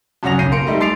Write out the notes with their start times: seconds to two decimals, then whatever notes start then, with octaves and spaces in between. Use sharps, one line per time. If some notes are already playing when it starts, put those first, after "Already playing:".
0.23 F#2 C#3 C#5 F#5 A#6 F7
0.39 B1 C#3 G6 A#6 C7 D#7
0.52 A#3 C6 C#7 D7
0.67 G3 A3 D#4
0.80 C6 A6 C7 D7 F7